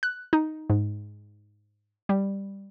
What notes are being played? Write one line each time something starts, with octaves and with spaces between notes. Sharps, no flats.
F#6
D#4
G#2
G3